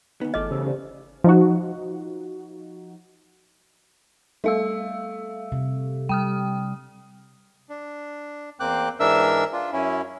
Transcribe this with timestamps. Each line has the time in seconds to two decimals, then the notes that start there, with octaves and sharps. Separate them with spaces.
0.21 D2 B3 D#4
0.34 G1 E2 A3 D#5 D6 F6
0.51 C#3 G4 C5 E6
0.66 G4 C5 D5
1.24 F3 D#4 F#4
4.44 G3 A3 F5 E6
5.52 C3
6.09 G3 G5 D#6 F6
7.69 D4
8.60 E2 A#3 C4 G5 D6 F#6
9.00 G#2 E3 D4 A#4 E5 E6
9.53 D4 F4
9.73 F#2 C#4 E4